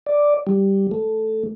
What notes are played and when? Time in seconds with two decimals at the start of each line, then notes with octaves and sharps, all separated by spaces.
0.07 D5
0.47 G3
0.91 A3